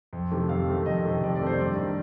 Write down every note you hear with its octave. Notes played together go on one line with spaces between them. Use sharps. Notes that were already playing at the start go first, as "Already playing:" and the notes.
F2
C3 D#3 A3
F2 F5
C3 D#3 A3
F2 D#5
C3 D#3 A3
F2 D5
D5
C3 D#3 A3 C5
G2 D5
D#3 G3